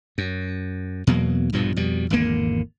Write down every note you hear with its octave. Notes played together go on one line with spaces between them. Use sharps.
F#2
E2 B2 F#3 A#3
A#1 G2 B2 F3
F2 B2 G3
G#1 E2 D3 A#3